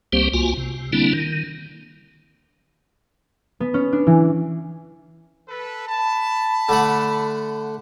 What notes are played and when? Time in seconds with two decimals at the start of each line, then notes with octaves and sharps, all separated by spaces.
0.13 C#2 G3 A#3 C4 G4 C5
0.34 C2 A#3 F4 F#4 G#5
0.57 C3
0.93 D3 G3 A#3 C4 D4 E4
1.14 D#3
3.60 B3
3.74 C#4
3.93 D4
4.07 E3
5.48 A4 B4
5.88 A5 B5
6.69 D3 A3 F#5